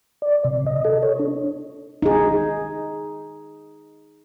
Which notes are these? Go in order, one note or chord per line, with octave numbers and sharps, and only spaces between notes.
D5
C3
D#5
A4
C#5
D4
D#4 G#4